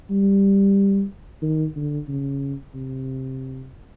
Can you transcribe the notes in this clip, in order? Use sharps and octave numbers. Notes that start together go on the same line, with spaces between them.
G3
D#3
D3
C#3
C3